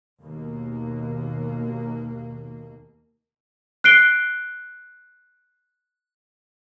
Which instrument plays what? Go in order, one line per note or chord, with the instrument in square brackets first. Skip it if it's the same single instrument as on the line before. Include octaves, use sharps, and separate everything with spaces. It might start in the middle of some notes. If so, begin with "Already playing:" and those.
[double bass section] D#2 B2 A#3
[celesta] F#6 C7 D7 G7